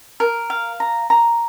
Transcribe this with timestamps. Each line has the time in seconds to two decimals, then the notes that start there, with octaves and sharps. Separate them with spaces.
0.20 A#4
0.50 F5
0.80 A#5
1.10 A#5